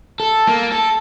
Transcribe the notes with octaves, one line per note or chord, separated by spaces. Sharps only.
A4
A#3
A4